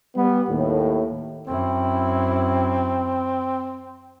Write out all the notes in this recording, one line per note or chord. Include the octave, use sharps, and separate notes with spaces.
G3 B3
D#2 A2
F#2 C4 E4